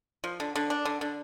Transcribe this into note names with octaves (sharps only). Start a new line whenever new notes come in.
F3
D3
D3
D4
D3
D3